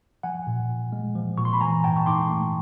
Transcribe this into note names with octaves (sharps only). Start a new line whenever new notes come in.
F3 F#5 G#5
A#2
A#2
G#3
F3
A#2 C#6
C6
B5
E3 G#5 A#5
G#2 G5 A5
C#6
G#2 C6 D6
A3